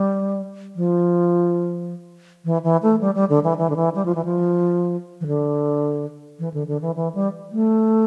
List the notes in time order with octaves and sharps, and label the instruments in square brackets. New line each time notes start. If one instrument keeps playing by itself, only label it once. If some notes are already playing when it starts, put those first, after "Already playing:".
Already playing: [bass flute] G3
F3
E3
E3
A3
G3
G3
D3
E3
E3
D3
E3
G3
F3
E3
F3
E3
D3
E3
D3
D3
E3
E3
G3
A3